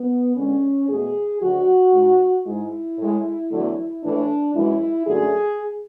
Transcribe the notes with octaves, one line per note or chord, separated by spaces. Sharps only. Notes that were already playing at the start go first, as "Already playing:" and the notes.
Already playing: B3
E2 D3 G#3 C#4
E2 B2 A3 G#4
D2 D3 F#3 F#4
G#2 G#3
G#2 G#3 E4
A2 G#3
E2 D3 F#3 A3
A2 E3 A3 D4
F#2 E3 G#3 E4
F#2 D3 F#3 A3 G#4